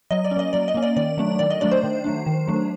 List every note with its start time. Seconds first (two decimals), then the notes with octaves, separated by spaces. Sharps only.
0.11 F#3 D#5
0.24 D5
0.31 C#4
0.36 A#3 D#5
0.53 F#3 D5
0.68 D#5
0.74 A#3 C#4
0.83 D5
0.96 D#3 D5
1.18 F#3 A3 D4
1.39 D#3 D5
1.51 D#5
1.61 F#3 A3 D4 D5
1.71 C5
1.83 D#3
2.04 F#3 A3 D4
2.26 D#3
2.47 F#3 A3 D4